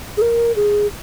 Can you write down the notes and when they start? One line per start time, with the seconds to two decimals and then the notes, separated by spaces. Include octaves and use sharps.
0.17 G#4
0.21 A#4
0.56 G#4